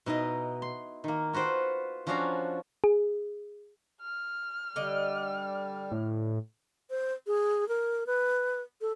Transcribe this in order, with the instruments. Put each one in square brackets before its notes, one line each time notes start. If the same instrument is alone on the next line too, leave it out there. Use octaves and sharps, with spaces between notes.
[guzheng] B2 D#4 E4 D#5
C6
D#3 A#3
F4 F#4 B4 C5 G5
F3 C#4 D4 F#4 F5 A#5
[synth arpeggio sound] G#4
[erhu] F6
[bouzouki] D3 D#5 [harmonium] G3
[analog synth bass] A2
[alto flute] C5
G#4
A#4
B4
A4